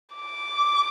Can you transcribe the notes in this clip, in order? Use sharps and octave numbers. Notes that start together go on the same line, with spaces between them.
D6